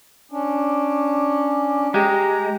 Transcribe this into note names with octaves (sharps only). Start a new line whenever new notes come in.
C#4 D4 D6
G#3 G4 A#5